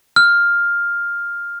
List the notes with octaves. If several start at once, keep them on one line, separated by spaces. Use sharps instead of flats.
F6